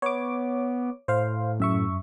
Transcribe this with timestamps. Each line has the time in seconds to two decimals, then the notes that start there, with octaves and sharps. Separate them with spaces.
0.02 B3 C#5 D6
1.08 A2 C5 F5
1.60 F#2 E5 C#6